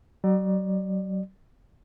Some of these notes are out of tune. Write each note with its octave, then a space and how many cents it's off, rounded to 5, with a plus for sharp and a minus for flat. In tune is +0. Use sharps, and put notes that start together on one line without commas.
F#3 +40 D5 +30